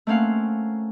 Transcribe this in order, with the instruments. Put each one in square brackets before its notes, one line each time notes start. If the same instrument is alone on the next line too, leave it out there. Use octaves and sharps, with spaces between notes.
[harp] A3 A#3 C4 C#4 F5 F#5